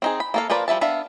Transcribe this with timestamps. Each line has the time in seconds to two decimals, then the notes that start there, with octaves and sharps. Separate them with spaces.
0.02 C4 D#4 G#4
0.20 B5
0.34 A#3 A4 F5
0.50 F3 F4 A#4 B4 D5
0.68 F3 G3 E5 A5
0.81 B3 D4 E5 F5